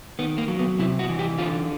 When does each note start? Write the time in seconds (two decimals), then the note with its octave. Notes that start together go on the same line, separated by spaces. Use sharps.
0.19 D#3 B3
0.38 A#3
0.48 F#3
0.59 B3
0.79 C3 E4
0.99 F#4
1.09 E3
1.19 G4
1.39 D3 F4